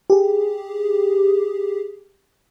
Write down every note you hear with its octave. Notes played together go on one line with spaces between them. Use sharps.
G4 G#4